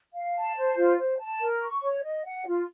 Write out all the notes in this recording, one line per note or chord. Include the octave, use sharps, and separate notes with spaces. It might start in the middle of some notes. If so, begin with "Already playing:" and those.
F5
A5
C5
F4
C5
A5
A#4
C#6
C#5
D#5
F#5
F4